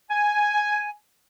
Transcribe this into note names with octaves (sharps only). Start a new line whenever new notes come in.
G#5